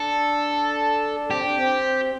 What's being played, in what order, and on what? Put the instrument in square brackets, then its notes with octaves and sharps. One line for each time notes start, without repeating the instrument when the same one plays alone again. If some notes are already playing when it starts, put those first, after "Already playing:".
Already playing: [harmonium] D4 [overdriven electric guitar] A4
[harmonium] C4 [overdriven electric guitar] G4
[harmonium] D4
C4